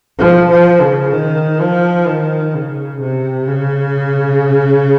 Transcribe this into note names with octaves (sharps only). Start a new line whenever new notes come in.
F3
F3
C#3
D#3
F3
D#3
C#3
C3
C#3